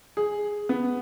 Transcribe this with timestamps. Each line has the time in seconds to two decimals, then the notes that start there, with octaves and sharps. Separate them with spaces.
0.17 G#4
0.69 B3